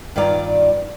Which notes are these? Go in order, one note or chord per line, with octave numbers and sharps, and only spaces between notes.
G2 D#3 F4 D5 A#5